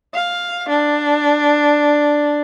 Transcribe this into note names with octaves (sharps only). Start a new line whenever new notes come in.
F5
D4